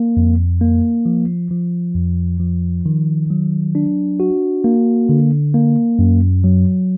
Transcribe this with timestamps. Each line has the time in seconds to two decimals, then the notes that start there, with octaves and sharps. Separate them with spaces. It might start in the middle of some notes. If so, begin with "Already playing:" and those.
Already playing: A#3
0.17 F2
0.61 A#3
1.06 F3
1.51 F3
1.95 F2
2.40 F3
2.86 D#3
3.30 F#3
3.75 D4
4.20 F#4
4.64 A#3
5.09 D3
5.54 A#3
5.99 F#2
6.44 F#3